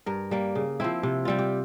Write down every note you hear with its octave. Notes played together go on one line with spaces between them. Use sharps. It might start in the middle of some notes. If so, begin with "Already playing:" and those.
G2 A#4
G3 A#3
C#3
F3 C4 E4
C3
G3 C4 F4
G4